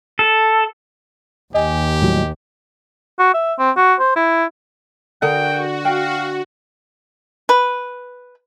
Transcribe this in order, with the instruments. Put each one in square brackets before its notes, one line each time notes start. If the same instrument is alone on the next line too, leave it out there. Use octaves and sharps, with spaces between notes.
[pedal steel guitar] A4
[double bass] D#2 [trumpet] G4 [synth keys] D#5 G#5
[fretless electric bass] A2 F#3 G3
[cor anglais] F#4
E5
C4
F#4
C5
E4
[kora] D3 [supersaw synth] F#4 [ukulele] G#4 A#4 F#5 [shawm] G5
[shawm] F5 [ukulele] G5
[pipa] B4